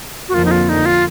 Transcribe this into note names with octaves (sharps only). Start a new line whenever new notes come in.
F#4
F2 D3 F3 A#3 F4
D#4
F4
D#4
F4